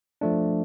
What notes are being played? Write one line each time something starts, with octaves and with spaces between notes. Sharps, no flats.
F3 A3 D4